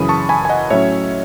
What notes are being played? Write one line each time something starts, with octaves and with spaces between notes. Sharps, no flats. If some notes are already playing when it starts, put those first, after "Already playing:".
Already playing: F#2 C#3 E3 B5 D#6
A5 C#6
G#5 B5
G#5
D#5 F#5
A2 F#3 C#4 C#5 E5